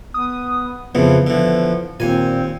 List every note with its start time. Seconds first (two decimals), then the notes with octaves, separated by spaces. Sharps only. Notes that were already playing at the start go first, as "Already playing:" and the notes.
0.14 B3 D#6
0.95 F2 C#3 E3 F3 B3
1.27 D3 E3 F3
2.00 D#2 A#2 C4 G#5